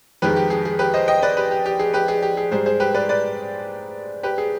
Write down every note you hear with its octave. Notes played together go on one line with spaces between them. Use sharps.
F2 D#3 G#3 G4 B4
G4
G#4
G#4
G4 B4
C5 D#5
D#5 G5
B4 D5
G4 B4
G4
G4
G#4
G4 B4
G#4
G4
G#4
G#2 G3 G#4 C5
G#4 C5
G4 B4
B4 D5
B4 D5
G4 B4
G#4